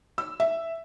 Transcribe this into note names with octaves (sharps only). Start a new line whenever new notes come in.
E6
E5